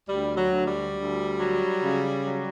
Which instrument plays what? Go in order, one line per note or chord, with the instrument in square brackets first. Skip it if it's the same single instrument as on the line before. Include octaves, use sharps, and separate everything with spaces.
[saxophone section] D2 G3
F#3
D2
G3
D2
F#3
C#3
F#3